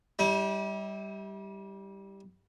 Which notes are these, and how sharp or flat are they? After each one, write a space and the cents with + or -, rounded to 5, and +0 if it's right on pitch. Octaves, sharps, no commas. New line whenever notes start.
G3 +0 E4 -40